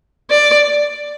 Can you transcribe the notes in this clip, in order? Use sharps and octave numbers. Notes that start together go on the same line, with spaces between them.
D5